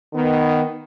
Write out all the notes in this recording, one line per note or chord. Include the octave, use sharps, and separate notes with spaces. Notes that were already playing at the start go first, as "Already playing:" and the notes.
D#3 B3